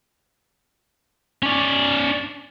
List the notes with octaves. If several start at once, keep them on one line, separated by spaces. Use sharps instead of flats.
C#4 D5